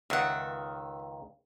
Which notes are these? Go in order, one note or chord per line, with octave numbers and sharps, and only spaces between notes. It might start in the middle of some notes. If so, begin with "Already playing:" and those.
C#2 D#3 E5 F#5